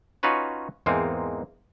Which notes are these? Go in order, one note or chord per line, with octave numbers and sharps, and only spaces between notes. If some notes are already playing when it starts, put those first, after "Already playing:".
C#4 D#4 F4 F#4 B4 C#5
E2 G#2 G#3 A#3 C4 D#4